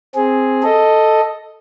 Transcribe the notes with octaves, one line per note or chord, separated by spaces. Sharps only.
C4 G#4
A4 D#5